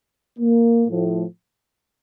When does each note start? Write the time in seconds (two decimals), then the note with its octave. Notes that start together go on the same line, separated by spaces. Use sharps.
0.39 A#3
0.88 A2 F3